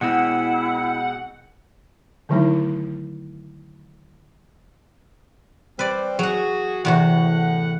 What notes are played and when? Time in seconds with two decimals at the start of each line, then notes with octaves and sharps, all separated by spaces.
0.01 B2 G#3 C4 E4 F#5
2.29 D3 D#3 F#3 A3 D#4 E4
5.79 G3 C4 B4 D5
6.19 F#3 F#4 G#4 F#5
6.85 E2 A2 C3 F#4 F#5